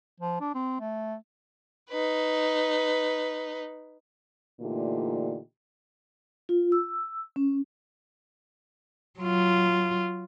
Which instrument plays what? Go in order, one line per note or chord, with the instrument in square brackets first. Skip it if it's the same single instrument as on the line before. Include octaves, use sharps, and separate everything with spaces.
[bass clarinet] F3
D4
C4
A3
[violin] D#4 B4
[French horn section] A#2 D3 E3 A3 D#4 G4
[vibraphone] F4
E6
C#4
[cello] F#3 F4